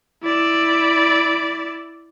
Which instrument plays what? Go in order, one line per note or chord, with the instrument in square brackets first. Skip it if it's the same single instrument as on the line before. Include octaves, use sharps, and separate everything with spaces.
[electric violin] E4 D5